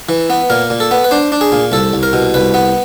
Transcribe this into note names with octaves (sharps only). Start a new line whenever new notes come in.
E3
B3
A#2 A#4
A#2
A4
B3
B4
D4 C5
D4
G#4
A#2
C2 A4
C2
A#4
B2
C2 B4
B3